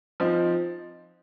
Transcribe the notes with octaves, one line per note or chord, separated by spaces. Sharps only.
F3 C4 D#4